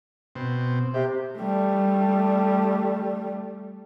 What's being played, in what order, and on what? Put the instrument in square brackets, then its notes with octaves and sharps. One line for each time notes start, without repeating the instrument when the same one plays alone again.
[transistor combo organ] B2 C4
[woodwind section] C3 [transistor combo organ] G4
[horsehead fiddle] G3 A3